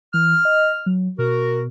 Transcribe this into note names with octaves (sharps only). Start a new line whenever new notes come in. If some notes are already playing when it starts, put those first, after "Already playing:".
E3 F6
D#5
F#3
B2 F#4 A#4